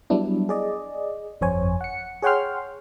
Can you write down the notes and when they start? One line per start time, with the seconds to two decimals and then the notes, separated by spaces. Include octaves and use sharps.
0.10 F#3 G3 B3 D4 E4
0.49 G#4 D5 D#5
1.41 G1 F2 C5 C#5 G#5
1.81 F#5 C#7
2.22 G#4 C#5 F#5 G5 C6 F6